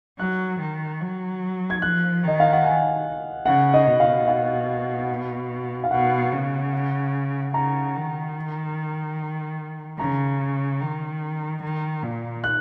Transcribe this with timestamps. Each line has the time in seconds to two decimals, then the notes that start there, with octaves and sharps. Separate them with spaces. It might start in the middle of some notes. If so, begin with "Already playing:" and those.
0.19 F#3 F#6
0.60 D#3
1.01 F#3
1.70 G#6
1.82 F3 F#6
2.24 D#3 D#5
2.40 F5
2.53 F#5
2.64 G#5
3.46 C#3 F#5
3.74 D#5
3.87 B2
4.00 F5
4.28 F5
5.84 F5
5.91 B2 F#5
6.32 C#3
7.54 C#3 A#5
7.95 D#3
9.99 C#3 A#5
10.81 D#3
11.63 D#3
12.03 A#2
12.44 F#6